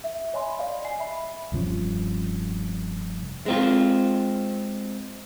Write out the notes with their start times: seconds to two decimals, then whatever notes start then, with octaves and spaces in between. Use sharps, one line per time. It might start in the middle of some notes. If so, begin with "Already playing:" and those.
0.04 E5
0.34 C#5 D#5 G#5 B5 C6
0.59 D5 D#5 F5
0.85 G#5 C7
1.00 E5 B5
1.52 F1 G2 F3 C#4
3.46 G#3 C4 F4